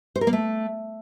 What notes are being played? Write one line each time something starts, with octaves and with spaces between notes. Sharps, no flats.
C5
A#4
A#3
A3